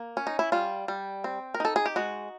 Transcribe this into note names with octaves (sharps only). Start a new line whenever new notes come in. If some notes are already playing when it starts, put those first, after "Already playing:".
Already playing: A#3
C#4
D#4
E4
G3 F4
G3
C4
A#4
D#4 A4
G#4
G4
G#3 F#4